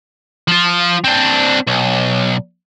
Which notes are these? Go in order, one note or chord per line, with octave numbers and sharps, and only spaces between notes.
F3 F4
C4 D4
B1